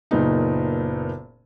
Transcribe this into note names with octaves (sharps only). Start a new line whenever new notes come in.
F#1 A#2 B3 D#4